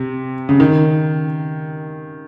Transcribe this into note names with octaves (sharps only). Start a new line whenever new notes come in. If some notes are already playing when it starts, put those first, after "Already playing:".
Already playing: C3
C#3
D#3